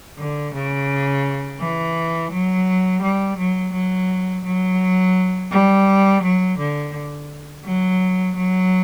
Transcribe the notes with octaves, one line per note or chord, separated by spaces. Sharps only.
D3
C#3
E3
F#3
G3
F#3
F#3
F#3
G3
F#3
D3
F#3
F#3